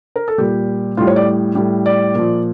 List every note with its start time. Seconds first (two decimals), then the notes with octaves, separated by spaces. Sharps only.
0.16 A#4
0.28 A4
0.38 A#2 G3 G4
0.97 A2 G3 F4
1.07 C#5
1.16 D5
1.55 A2 G3
1.86 D5
2.15 A#2 F3